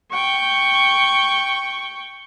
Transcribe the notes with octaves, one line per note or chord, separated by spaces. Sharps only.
G5 C#6